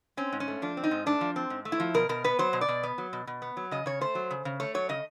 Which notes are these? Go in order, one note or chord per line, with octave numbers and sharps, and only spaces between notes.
C4 C#4
G#2
C#4
A3
F3 D4
C4
D#4
G#2
A3 D4
F3
C4
G#2
A3
E4
F3
B2 A#4
B2 A#4
B3 B4
F#3 C5
B2
D5
B2
B3
F#3
B2
B2
B3
F#3
C#3 D#5
C#3 C#5
A3 C5
F#3
C#3
C#3
A3 C#5
F#3 C#5
C#3 D#5